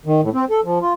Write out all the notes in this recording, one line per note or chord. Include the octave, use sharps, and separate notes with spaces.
D#3
A2
C4
A4
F3
F4